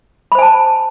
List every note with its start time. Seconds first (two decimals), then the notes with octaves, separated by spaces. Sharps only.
0.32 B5
0.35 C5
0.39 G#5
0.42 A5